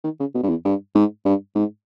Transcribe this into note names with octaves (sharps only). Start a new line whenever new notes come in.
D#3
C#3
B2
G2
E2
G2
G#2
G2
G#2